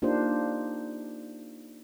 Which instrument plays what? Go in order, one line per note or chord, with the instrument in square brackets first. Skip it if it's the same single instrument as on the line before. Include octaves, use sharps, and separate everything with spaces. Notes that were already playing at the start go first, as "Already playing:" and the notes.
[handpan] A#3 D4 D#4 F4 G4 C5